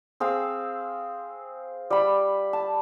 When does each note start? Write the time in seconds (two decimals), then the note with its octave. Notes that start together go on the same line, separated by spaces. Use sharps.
0.20 C4 G#4 F5 E6
1.90 G3 B5
2.53 A5